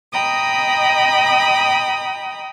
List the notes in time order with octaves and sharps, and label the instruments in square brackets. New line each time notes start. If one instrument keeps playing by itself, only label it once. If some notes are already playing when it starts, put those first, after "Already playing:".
[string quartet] D#5 G5 A#5 B5 D#6